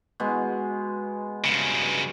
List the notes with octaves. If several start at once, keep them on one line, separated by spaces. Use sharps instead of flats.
B2 G#3
G2 C#3